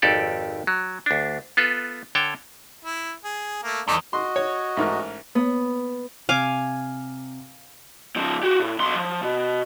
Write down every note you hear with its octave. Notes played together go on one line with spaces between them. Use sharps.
G#1 F2 G4 A4 D5
F#3
D2 D4
B3 F4 A4 B4
D3 C#5 G5 A5
E4
G#4
A3 A#3
E2 A3 D#4 D5
F#4 D#5 C6
C#5
A1 G#2 A#4
B3
C3 F5 G#5 D6
C#2 F3
F#4 G4
A2
B1 C6
F3
B2